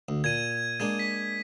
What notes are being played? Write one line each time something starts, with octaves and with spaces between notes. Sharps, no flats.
D2
A#2 G#6 D#7
G#3 A#3 D4 G#6
B6